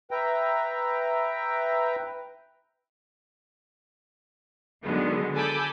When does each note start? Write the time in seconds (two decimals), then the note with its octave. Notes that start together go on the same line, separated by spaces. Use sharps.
0.11 B4 E5 G5 A#5
4.84 D3 D#3 F#3 G#3 B3
5.35 A4 G#5 A5 B5 D6 G6